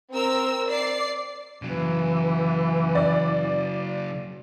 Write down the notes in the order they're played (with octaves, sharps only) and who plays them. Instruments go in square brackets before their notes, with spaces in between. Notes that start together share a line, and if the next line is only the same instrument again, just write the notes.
[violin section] C4 A#4 E6
D5 C7
[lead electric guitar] C#3 F#3 [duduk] E3
[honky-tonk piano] D5